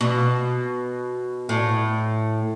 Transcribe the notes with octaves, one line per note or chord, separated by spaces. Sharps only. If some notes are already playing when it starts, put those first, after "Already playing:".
B2
A2